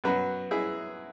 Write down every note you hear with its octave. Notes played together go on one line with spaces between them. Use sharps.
F#2 F#3 B3 F#4 B4
E4 G#4